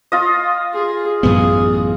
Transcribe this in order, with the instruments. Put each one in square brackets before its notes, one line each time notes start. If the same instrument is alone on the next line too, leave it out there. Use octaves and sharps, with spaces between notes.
[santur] F4 D#5
[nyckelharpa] G#4
[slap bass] A1 F#2 B3 [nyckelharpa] G#4